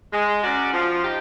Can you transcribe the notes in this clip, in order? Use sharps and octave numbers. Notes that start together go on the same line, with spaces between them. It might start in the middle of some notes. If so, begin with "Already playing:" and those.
G#3
C#4 F#4 A#4 D5
F3
D#4 G4